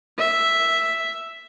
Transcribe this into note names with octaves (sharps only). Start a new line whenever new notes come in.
E5